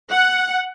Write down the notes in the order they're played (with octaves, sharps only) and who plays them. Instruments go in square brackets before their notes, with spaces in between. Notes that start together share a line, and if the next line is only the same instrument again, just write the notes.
[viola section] F#5